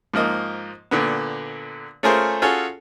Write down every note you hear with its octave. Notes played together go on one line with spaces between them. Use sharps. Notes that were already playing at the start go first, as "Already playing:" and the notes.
G#2 F3 A#3 D#5
A#2 D3 B3
A3 C#4 F4 G#4 A#4 C5
C#4 F4 F#4 G#4 A4 C#5